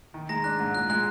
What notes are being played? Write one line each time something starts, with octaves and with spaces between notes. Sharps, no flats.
D#3
G#3 A#5 A#6
D4 F#6
G#2
A#2 F#6
G#3 F#6